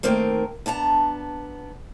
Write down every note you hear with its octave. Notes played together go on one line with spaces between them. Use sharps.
D#3 A3 A#3 C4 A#4
B3 D4 A5 A#5